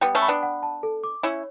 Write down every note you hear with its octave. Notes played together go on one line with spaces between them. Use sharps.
G3 B3 G5
A3 C#4
B5
B3 D4
F#5
A5
A4
D6
C#4 E4 C#5